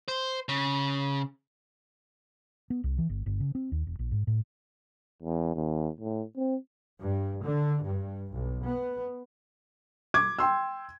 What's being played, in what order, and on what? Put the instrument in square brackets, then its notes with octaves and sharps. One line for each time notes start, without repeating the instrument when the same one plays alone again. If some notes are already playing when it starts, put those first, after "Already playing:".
[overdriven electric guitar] C5
C#3
[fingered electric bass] B3
C2
E3
G1
G1
C#3
C4
D#2
E1
A#1
G#2
A2
[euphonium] E2
D#2
A2
C4
[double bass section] G2
D3
G2
B1
B3
[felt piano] D6 G#6
G5 C6 E6